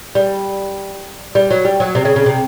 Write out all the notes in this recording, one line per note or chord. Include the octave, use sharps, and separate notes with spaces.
G3
G3
F#3
G3
F#3
C3
C#3
C#3
C3